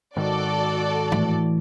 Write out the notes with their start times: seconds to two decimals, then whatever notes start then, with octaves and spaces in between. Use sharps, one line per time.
0.17 G#2 D#3 F#4 A4 D5
1.11 A2 E3